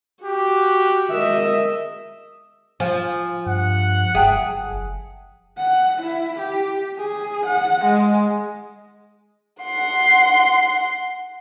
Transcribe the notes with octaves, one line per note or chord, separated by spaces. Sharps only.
F#4 G4
G#3 A#4 D#5 E5
F3 G#5
G2 F#5
F#1 G#4 E5 G5 A5
F#5
E4
G4
G#4
F#5
G#3
F#5 C6